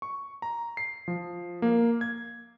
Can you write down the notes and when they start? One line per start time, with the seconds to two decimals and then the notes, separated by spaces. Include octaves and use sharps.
0.02 C#6
0.42 A#5
0.77 C7
1.08 F3
1.62 A#3
2.01 G#6